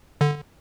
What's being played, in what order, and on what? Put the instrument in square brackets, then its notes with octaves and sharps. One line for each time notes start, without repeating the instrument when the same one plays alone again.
[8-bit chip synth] D3